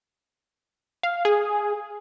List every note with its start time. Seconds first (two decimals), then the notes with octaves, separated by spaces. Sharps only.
1.03 F5
1.25 G#4